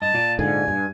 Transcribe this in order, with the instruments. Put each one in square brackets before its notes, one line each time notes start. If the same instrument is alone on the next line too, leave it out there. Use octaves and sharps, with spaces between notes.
[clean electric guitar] G2 D#5 [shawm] A5
[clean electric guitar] A#2 F4 D5
[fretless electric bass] G#2 D3 [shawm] G#5
[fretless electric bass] G2